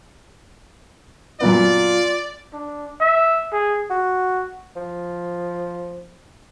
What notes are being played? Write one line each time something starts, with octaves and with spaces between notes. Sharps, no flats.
F#2 A#2 B3 F4 D5
D4
E5
G#4
F#4
F3